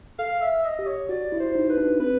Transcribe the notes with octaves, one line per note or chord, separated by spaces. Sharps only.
A4 F5
E5
D#5
G4
C#5
F#4 D5
E4
C5
D#4
B4
D4
C4 B4